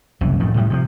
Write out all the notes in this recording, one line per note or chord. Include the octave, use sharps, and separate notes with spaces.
F#1 C2 F#2 E3
A1 F2 A2 D#3
A2 G3
C3 D#3 F3